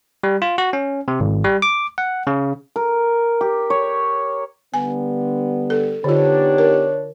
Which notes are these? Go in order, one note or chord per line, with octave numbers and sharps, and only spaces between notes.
G3
F4
F#4
C#4
C3
G#1
G3
D6
F#5
C#3
A#4
G4
C#5
D3 G3 B3 G#5
A4
D3 B3 D4 D#4 F4 G4 C#5
A#4